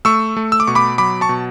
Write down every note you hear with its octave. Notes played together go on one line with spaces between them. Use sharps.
A3 C#6 E6
A3
E6
D6
B2 C#6
B5 D6
F#3 B5 D6
A5 C#6
B2